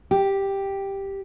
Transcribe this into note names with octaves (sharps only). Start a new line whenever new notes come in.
G4